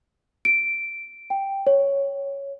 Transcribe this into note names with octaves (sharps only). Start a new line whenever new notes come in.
D7
G5
C#5